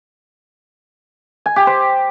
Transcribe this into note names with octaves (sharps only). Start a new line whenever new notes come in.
G#5
G4
C5